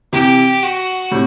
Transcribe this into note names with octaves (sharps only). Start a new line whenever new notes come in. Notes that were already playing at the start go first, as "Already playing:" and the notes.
C3 E3 G4
F#4
A2 C3